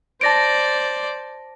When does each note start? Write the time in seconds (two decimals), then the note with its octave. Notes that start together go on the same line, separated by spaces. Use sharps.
0.21 C5 D5 A5 A#6 D7